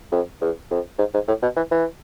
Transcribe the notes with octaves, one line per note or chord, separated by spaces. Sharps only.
F2
E2
F2
G#2
G#2
A2
B2
E3
E3